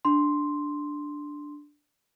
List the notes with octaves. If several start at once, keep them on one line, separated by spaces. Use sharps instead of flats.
D4 C6